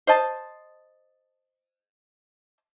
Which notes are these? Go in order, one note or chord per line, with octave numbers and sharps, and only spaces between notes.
C5 D#5 A5